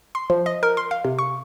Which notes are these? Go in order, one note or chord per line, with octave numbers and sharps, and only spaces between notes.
C6
F3
D#5
A#4
C6
F5
C3
C#6